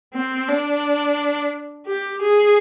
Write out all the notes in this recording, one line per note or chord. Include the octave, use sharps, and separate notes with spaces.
C4
D4
G4
G#4